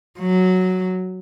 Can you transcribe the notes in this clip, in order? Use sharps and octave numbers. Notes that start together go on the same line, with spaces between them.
F#3